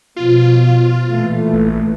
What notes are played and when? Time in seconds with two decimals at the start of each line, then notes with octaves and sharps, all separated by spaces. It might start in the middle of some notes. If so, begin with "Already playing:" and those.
0.16 B2 F3 F4
1.11 A#2 E3 A3
1.54 A1